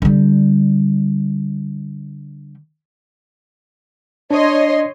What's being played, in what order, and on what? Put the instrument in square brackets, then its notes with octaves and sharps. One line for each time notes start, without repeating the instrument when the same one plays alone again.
[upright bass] D3 G3
[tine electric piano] D4 [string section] C#5 D#5 C6